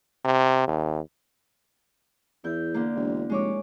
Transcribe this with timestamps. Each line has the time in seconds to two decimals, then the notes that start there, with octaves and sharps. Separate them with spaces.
0.25 C3
0.68 D#2
2.44 E2 E4 G6
2.74 D3 A#3
2.95 E1
3.30 F1 G#3 C#5 D6